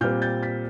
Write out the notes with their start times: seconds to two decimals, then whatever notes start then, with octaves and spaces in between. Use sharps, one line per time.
0.01 A#2 G3 C4 F6 G6
0.22 G6 A6
0.42 A6 B6